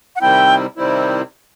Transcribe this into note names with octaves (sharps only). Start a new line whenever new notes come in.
F#5
C3 D#3 G3 C4 E4 G5
C3 D#3 G3 C4 E4